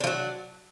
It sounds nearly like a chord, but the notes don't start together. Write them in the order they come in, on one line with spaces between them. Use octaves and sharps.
D4 F3 F#3